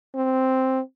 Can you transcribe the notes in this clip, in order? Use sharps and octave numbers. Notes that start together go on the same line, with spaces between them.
C4